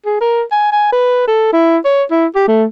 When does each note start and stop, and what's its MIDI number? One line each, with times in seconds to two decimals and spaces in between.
0.06 0.20 68
0.21 0.42 70
0.52 0.71 80
0.72 0.91 80
0.92 1.24 71
1.27 1.50 69
1.53 1.77 64
1.85 2.03 73
2.11 2.26 64
2.35 2.45 67
2.47 2.64 57